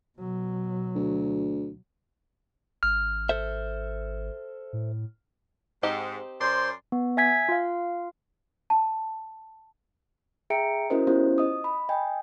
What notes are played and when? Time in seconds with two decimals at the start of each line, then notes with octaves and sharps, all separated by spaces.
0.18 B2 F#3
0.95 D2
2.83 G#1 F6
3.29 A4 C5 E5
4.73 A2
5.83 G#2 C4 D#4 G4
6.41 F#2 C5 D5 C6
6.92 B3
7.17 E5 G#5 G#6 B6
7.49 F4 F5
8.70 A5
10.50 G#4 E5 G5 A#5 C#7 D7
10.90 C#4 E4 F#4 A#4 C5 D#5
11.07 B3 C#4 E4 F4 G4 C5
11.38 D#5 D#6
11.64 B5
11.89 D#5 G5 G#5